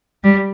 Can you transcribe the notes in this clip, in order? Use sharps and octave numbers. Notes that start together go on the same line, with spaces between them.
G3